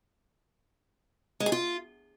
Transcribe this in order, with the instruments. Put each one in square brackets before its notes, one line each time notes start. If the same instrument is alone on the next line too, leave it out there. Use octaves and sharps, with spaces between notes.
[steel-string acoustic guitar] G#3
G#4
F4